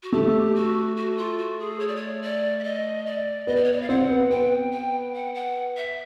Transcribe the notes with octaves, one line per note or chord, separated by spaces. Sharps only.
F#4
A3 G4
F#4
F#4
F4
F#4
G#4
C#5
D5
C#5
D5
E5
D#5
D5
B3 D#5
D5
C#5
D5
F5
C4 F#5
B3
B3 G5
G5
F#5
F#5
E5